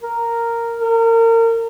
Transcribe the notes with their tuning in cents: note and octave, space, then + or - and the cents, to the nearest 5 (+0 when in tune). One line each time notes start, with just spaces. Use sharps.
A#4 -5
A#4 -30